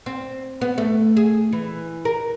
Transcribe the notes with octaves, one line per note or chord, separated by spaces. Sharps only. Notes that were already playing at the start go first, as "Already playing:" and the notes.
C4
B3
A3
G#4
E3
A#4